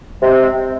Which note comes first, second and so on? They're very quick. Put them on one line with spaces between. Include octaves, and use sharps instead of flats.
G#3 C3 C4